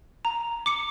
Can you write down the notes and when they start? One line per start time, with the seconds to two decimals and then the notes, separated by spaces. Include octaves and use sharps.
0.25 A#5
0.66 D6 C#7